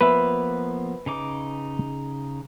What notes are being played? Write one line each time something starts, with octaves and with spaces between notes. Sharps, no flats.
F3 A#3 B3 B4 E5
C#3 D#4 D6